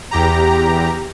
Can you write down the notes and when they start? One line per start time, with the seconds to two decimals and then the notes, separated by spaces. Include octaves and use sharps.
0.11 E2 G4 A#5